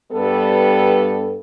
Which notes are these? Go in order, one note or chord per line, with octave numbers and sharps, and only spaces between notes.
G2 G3 B3 A4